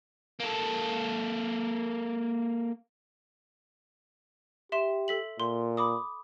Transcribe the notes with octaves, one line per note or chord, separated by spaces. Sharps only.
A#3 A4
G4 E5 C6 E7
A4 B6 F#7
A#2 C6
B5 D6 D#6